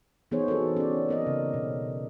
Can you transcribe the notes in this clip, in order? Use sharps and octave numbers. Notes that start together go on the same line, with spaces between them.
E3 B3 D#4 G#4 C5 C#5
C4 F#4 G#4 A4
C#4 D5
B3 A#4 D#5
C#3
B2